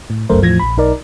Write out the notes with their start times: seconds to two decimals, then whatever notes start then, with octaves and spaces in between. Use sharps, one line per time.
0.10 A2
0.29 G1 C#2 F#2 A3 A#4 C5
0.41 E2 A2 F3 G#6 A#6
0.59 A#1 B5
0.77 B1 D#4 A#4 D5